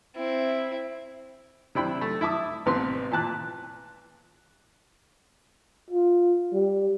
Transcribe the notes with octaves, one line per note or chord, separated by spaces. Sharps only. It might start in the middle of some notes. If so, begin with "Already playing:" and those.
C4 E4
C3 D4 E4 G5 B5
A3
E4 E5 A5 D6 D#6
A1 C3 B3 C4 C6
A#2 E3 A5 F#6
F4
G3